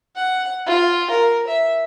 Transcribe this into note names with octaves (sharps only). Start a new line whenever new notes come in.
F#5
F4
A#4
E5